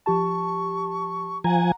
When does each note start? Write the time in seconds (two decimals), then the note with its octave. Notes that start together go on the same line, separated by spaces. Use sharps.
0.06 F3 G4 A5 C#6
1.44 F3 F#5 G#5 A#5